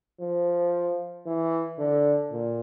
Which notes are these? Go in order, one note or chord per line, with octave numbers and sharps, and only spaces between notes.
F3
E3
D3
A#2